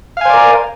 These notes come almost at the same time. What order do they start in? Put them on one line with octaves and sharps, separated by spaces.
F5 G#5 C5 D5 A#4